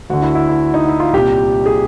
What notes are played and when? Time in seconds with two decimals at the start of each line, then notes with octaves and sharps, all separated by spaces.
0.10 D2 D3 F#4
0.22 E4
0.35 E4
0.49 E4
0.74 D#4
0.88 E4
1.00 F4
1.13 C2 A#2 G4
1.66 G#4